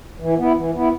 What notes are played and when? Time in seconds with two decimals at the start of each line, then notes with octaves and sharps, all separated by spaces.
0.20 E3
0.38 B3 E4
0.56 E3
0.75 B3 E4